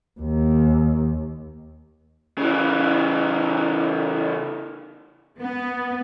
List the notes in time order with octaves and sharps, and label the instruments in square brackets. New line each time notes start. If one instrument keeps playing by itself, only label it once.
[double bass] D#2
[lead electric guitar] C#3 E3
[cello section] B3